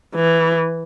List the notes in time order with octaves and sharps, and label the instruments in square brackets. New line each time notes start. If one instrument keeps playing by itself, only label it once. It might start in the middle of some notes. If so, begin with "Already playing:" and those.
[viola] E3